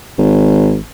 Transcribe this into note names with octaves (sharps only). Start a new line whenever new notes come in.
G#1